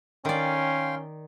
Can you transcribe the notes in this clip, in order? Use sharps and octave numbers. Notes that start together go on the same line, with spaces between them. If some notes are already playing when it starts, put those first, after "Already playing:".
D#3 C#4 D5 F5 G5 C6